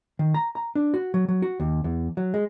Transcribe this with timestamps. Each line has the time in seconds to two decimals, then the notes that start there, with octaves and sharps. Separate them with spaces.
0.19 D#3
0.34 A#5
0.55 A#5
0.75 D4
0.94 F#4
1.14 F#3
1.28 F#3
1.42 F#4
1.60 D#2
1.84 E2
2.17 F#3
2.34 G#3